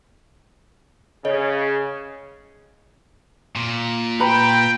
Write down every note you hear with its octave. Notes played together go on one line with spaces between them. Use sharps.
C#3 C#5 D#5
A#2
B4 G5 A#5 B5